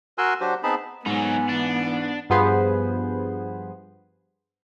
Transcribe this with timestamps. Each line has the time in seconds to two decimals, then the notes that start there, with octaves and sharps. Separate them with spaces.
0.18 F#4 A#4 G#5 C6 E6 F#6
0.41 F#3 D4 F#4 G4 C5
0.63 B3 C4 D#4 G#4 A5 B5
1.06 G#2 F#3 B3 D#4 G#5
1.49 E3 D4
2.30 G2 F3 B3 G#4 B4 C5